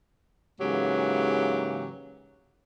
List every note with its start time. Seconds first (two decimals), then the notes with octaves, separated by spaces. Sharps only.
0.60 G#2 C#3 E3 F#3 A#3 G4